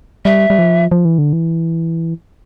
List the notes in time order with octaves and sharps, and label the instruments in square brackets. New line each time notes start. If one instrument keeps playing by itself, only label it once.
[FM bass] G3 [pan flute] E5
[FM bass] G3
F3
F3
E3
D3
E3